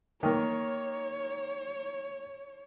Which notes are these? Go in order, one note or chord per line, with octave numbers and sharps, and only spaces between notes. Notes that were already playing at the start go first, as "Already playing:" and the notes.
D#3 A#3 C#5